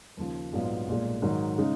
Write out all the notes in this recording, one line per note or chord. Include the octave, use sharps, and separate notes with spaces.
D#2 C#3 F3
A#1 G#2 F#3 B3 F4
B1 A#2 G#3
G#2 D#3 F#3
C#3 G#3 D#4